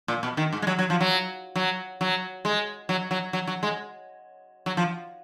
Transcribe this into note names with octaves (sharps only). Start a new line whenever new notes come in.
A#2
B2
D#3
G#2
G#3
F#3
F#3
F3
F#3
F#3
F#3
G#3
F#3
F#3
F#3
F#3
G#3
F#3
F3